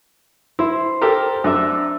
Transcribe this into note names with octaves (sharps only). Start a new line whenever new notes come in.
E4 C5
G4 A4 A#4
F#2 D4 E5